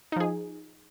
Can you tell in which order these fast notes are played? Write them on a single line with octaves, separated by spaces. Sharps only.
D#4 F3 G#4